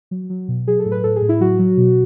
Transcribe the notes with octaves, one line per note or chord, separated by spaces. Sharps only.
F#3
F#3
B2
F#3 G#4
A4
A2
B4
A2 A4
G#4
A2
E4
F#3 F#4
F#3
B2